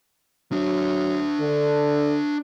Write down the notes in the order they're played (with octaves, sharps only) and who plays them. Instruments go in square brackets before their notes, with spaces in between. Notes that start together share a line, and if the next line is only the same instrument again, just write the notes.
[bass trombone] F#3 [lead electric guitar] D4 E5
[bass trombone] D3